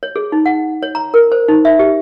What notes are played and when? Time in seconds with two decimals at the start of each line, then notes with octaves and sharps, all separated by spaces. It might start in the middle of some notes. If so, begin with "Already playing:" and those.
0.03 C#5
0.16 G#4
0.32 D#4
0.46 F#5
0.83 C#5
0.95 A#5
1.14 A#4
1.32 C5
1.48 D#4
1.65 E5
1.79 G4